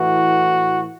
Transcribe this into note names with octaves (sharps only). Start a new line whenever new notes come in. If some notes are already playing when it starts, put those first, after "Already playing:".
Already playing: A2 E3 F#4